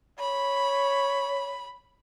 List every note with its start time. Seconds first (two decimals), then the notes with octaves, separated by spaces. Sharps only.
0.20 C#5 B5